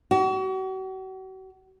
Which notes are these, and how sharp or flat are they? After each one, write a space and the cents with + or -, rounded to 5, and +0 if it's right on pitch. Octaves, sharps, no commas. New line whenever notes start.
F#4 +40